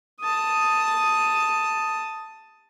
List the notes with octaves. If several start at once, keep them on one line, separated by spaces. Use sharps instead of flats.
A5 D#6